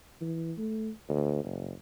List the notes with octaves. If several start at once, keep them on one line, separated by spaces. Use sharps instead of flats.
E3
A3
D2
F#1